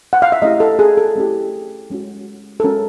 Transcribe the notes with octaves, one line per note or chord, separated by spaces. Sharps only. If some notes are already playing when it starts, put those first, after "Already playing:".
F#5
F5
E5
A3 C#4 E4 G4 D#5
A4
G#4
A4
A3 C#4 E4 G4
G#3 C#4 F#4
A4
G#3 C#4 F#4 A#4